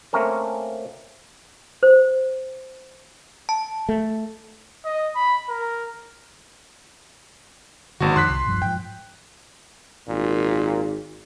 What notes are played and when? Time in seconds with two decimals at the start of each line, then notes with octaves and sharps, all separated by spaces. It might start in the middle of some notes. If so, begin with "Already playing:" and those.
0.13 A3 A#3 C4 C#4 A#4
1.83 C5
3.49 A5
3.89 A3
4.85 D#5
5.15 B5
5.49 A#4
8.00 G#1 D3 A#3 F#4
8.16 F2 D#3 C6 F#6 B6
8.29 C2
8.47 E1 G2 F3
8.62 G#2 F3 G5
10.08 G#1 A#2